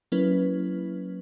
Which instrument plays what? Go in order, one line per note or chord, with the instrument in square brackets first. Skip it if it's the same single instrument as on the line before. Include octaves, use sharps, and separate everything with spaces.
[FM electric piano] F#3 A#3 C#4 E4 B4